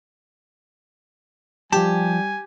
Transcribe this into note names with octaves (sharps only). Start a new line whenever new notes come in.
F3 G3 G4 G#5 A5